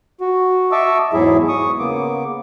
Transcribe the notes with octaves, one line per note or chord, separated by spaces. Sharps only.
F#4
D#5 E5 A5 C#6 D6 E6
E2 G#2 F#3 E4 G#4 E5
C#6 D#6
C#3 A#3 B3 D6